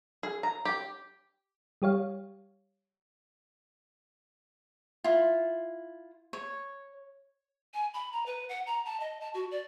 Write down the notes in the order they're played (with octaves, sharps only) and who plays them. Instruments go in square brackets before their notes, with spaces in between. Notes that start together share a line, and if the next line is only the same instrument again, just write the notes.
[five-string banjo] G#4
A#5
G4
[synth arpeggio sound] G3 G4 C#5 F5
[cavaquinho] E4 F4
C#5
[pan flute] G#5
B5
A#5
B4
F#5
A#5
A5
D#5
A5
F#4
D5